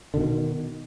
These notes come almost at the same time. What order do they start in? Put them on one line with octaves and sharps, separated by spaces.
D3 B2 D#3